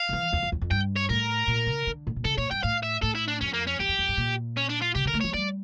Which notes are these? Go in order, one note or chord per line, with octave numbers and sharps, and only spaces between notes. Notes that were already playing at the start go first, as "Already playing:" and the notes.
Already playing: F5
D3
E3
E2
F2
E2
F2
G2 G5
C#5
A2 A#4
A#2
C#3
D3
A2
A#2
C#3 A4
A#2 C#5
G2 G5
A2 F5
E5
A2 A4
E4
D4
F2 C#4
A#3
C#4
E2 G4
F2
F2
G2
A#2
C#4
D4
F4
C#3 G4
D3 A#4
A3
F3 C#5
G3 D5